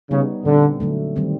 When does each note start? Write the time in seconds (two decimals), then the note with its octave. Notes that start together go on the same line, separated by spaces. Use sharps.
0.11 C#3 G3 B3 D#4
0.45 A#2 D3 G3 C4
0.80 D3 F#3 A3
1.16 D#3 G3 C4